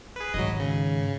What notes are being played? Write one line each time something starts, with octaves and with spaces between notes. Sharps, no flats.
G#4 B4
G#2 D#3 F#3 D#5
C#3